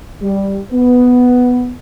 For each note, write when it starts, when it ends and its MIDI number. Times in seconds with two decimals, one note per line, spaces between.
0.21 0.59 55
0.72 1.71 59